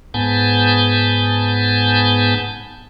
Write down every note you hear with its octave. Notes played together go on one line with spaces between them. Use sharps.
G#2 B3 G#5 A5 G6